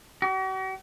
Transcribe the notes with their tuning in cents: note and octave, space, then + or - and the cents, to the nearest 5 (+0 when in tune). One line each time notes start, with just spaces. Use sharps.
F#4 +45